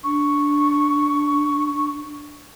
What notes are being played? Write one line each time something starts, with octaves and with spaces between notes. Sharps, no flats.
D4 C#6